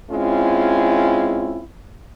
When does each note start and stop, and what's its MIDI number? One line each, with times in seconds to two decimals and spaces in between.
0.11 1.63 56
0.11 1.63 60
0.11 1.63 61
0.11 1.63 64
0.11 1.63 65